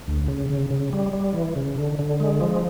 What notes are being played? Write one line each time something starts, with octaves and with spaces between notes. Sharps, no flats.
D2
C#3
C#3
C#3
G3
G3
E3
C#3
D3
D3
G#3
F3